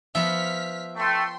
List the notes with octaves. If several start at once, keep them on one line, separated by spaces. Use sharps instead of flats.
F3 B3 E5 F6 B6
A3 G5 C6